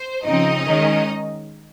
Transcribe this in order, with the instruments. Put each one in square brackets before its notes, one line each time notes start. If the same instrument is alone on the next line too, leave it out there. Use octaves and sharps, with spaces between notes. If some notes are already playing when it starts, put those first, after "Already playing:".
Already playing: [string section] C5
C#3 F3 C4 D#4 D#5
D#3 G#3 C#4